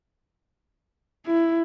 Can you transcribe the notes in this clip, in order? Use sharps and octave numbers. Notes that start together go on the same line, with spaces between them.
E4